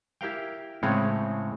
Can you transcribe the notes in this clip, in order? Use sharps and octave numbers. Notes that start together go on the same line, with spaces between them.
E4 G4 A#4 F5 G5
A2 C#3 G#3 C4 C#5